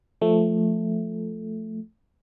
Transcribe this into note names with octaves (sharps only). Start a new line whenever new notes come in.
F3 A3